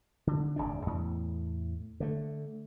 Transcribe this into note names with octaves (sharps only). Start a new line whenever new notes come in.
D3
D1 G1 G#2 D4
E2 A2
D3 A3